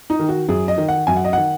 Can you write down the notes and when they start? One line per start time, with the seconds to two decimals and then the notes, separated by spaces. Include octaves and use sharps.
0.10 D#4
0.19 D#3
0.29 F#4
0.49 F#2 G#4
0.68 D#5
0.78 D#3
0.88 F#5
1.07 F#2 G#5
1.17 F#5
1.25 D#5
1.33 D#3 F#5